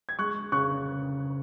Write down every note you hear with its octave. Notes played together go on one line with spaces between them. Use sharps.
G#6
G#3 C#6 F#6
C#3 C#6 F#6